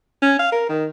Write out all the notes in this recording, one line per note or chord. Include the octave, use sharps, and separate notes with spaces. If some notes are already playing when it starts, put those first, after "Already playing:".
C#4
F5
A#4
D#3